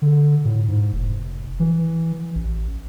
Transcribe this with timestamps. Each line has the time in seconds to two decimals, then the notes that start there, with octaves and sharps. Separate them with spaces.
0.02 D3
0.45 A2
0.68 G#2
0.93 F1
1.60 E3
2.35 A1